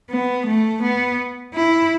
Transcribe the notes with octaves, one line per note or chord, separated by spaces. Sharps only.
B3
A3
B3
E4